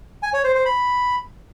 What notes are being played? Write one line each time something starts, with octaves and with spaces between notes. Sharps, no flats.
G#5
C#5
C5
C5
B5